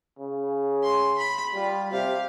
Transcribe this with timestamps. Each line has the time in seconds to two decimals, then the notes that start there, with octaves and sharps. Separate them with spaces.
0.19 C#3
0.83 C6
1.18 B5
1.54 G3 F4
1.91 C3 G4 F5